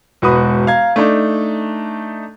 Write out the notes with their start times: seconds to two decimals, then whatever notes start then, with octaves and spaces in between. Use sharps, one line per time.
0.22 E1 G#2 F#4 B4 B5 D#6
0.67 F5 A#5 G#6
0.96 A3 D4 D#4